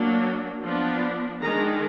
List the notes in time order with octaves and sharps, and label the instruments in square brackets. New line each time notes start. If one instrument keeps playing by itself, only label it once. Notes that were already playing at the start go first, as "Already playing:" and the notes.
Already playing: [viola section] F#3 A#3 D4
F3 B3 D4
D#3 G#3 D4 A#5